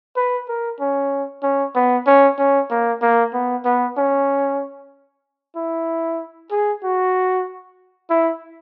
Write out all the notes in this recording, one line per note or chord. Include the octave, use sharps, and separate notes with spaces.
B4
A#4
C#4
C#4
B3
C#4
C#4
A#3
A#3
B3
B3
C#4
E4
G#4
F#4
E4